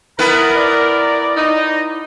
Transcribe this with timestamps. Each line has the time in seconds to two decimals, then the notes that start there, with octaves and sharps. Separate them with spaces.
0.19 B3 E4 A#4 B4 A#5
0.56 D5
1.36 D#4